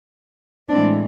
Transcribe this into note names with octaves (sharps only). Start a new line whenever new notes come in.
A2 E3 G#3 C4 D4